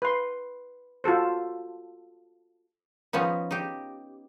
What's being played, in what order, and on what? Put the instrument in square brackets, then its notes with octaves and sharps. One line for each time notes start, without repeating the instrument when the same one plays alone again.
[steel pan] B4 C6
F4 F#4 A4 C5
[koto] F3 B3 C#4 D#4
D#4 G4